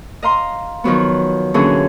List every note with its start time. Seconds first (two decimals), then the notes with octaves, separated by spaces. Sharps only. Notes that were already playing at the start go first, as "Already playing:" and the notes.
0.23 D#5 F5 A#5 C6
0.84 D#3 F3 F#3 B3
1.54 A#2 D3 E3 F#3 C#4 G#4